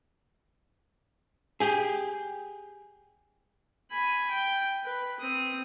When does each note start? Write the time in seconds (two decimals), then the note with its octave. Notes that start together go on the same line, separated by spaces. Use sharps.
1.60 G4 G#4
3.91 G#5 B5
4.30 G5
4.84 B4
5.20 C4 D#6